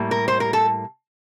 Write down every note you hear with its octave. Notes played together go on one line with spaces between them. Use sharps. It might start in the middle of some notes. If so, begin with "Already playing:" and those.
Already playing: A2 G3 A#3
A#4
C5
A#4
A4